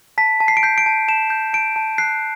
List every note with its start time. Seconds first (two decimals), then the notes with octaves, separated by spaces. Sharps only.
0.18 A5 B6
0.40 A5
0.48 C7
0.57 D7
0.63 G6 C7
0.78 D7
0.86 A5
1.08 A5 E7
1.30 G6
1.53 A5 D7
1.76 A5
1.98 F#6 C7